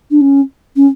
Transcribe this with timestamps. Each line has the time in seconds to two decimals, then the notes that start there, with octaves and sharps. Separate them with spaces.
0.11 D4
0.21 C#4
0.76 C#4